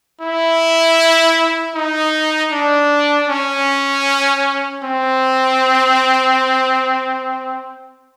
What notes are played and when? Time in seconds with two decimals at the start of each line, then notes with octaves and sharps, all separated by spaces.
0.21 E4
1.75 D#4
2.52 D4
3.30 C#4
4.84 C4